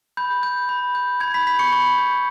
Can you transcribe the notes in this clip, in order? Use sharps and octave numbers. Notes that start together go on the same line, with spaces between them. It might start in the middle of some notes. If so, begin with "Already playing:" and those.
B5 G6
G6
B5
G6
B5 G#6
B5 B6
B5 G6 B6
C#6 C#7
B5 C#6 C#7
G6